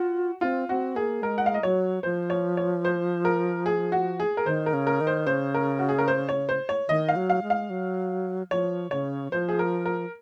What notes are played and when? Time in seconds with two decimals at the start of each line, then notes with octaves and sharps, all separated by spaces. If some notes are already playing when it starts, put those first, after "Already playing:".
Already playing: F4 F#4
0.41 C4 F4
0.69 C4 F#4
0.95 A#3 G#4
1.22 G#3 A#4
1.38 F#5
1.46 F5
1.54 D#5
1.63 F#3 C#5
2.03 F3 C5
2.30 C#5
2.57 C#5
2.85 C5
3.25 A#4
3.66 G#4
3.92 F#4
4.20 G#4
4.37 A#4
4.46 D#3 C5
4.66 A#4
4.73 C#3
4.87 A#4
5.01 D#3
5.07 C5
5.27 C#3 C5
5.54 A#4
5.79 F#4
5.89 G#4
5.98 A#4
6.08 C5
6.29 C#5
6.49 C5
6.69 C#5
6.89 D#3 D#5
7.09 F5
7.16 F#3
7.30 F5
7.43 G#3
7.50 F5
7.70 F#3
8.51 F3 C#5
8.91 C#3 C#5
9.32 F3 C5
9.49 G#4
9.59 A#4
9.85 A#4